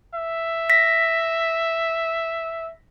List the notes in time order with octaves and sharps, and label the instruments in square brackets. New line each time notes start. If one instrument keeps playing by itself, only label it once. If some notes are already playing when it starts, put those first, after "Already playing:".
[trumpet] E5
[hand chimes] A#6 B6